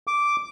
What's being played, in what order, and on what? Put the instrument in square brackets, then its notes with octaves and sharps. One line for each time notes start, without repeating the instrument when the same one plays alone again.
[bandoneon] D6